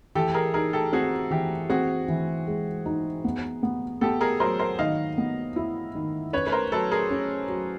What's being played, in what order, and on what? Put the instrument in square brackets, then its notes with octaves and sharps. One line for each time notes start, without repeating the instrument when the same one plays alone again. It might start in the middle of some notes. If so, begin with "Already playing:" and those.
[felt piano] E3 [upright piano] G4 A4
[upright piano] G#4 A#4
[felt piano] D#4 [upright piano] G#4 A#4
[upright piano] G4 A4
[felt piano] C4 [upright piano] F#4 G#4
[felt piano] E3 [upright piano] G4
[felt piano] C4 [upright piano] F#4 G#4
[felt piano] E3
G#3
D#4
B3
B3
[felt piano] B3 [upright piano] G4 A4
[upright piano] G#4 A#4
[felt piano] F#3 [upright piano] A#4 C5
[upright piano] A#4 C5
[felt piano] D#3 [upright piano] D#5 F5
[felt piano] B3
E4
D#3
[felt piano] C#4 [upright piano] B4 C#5
[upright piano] B4
A#4 C5
[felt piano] F#3 [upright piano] A4 B4
[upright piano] G#4 A#4
[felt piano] C#4
F#3